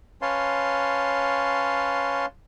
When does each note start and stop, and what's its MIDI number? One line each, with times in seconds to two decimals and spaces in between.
0.22 2.26 61
0.22 2.26 71
0.22 2.26 73
0.22 2.26 77
0.22 2.26 81
0.22 2.26 84